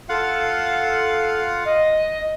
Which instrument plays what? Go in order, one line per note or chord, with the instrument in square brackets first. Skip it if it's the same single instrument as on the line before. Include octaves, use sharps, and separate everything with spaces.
[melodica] F4 F5 F#5 [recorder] A4
[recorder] D#5